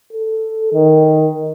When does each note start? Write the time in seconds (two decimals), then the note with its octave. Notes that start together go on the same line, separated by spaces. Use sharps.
0.13 A4
0.74 D#3